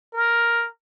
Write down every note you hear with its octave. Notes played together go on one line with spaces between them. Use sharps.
A#4